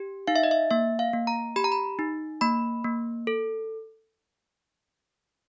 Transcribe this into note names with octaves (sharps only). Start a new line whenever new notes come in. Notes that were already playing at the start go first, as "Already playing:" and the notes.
Already playing: G4
D#4 F5
E5
D#5
E5
A#3 E5
F5
A#3
A#5
G4 B5
A#5
B5
D#4
A#3 B5
A#3
A4